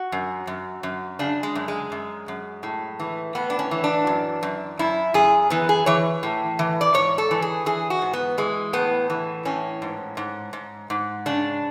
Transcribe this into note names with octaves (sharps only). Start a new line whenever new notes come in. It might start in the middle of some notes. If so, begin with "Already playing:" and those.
Already playing: F#4
F#2
F#2
F#2
C#3 D4
G#3
F#2
G#3
F#2
F#2
A2
E3
A2 B3
D4
C#4
E3
D4
F#2
F#2
F#2 E4
F#2 G#4
E3 B3
G#4
E3 C#5
A2
E3
D5
G#2 C#5
A4
E3
G#4
E3 G#4
F#4
G#2
B3
E3 G#3
A2 B3
E3
A2 C#4
G#2
G#2
G#2
G#2
C#3 D4